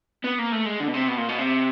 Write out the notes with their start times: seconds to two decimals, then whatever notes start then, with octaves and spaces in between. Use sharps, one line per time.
0.24 B3
0.39 A#3
0.52 A3
0.65 G#3
0.80 D3
0.88 B2
0.94 C3
1.08 B2
1.18 A#2
1.29 B2
1.39 C3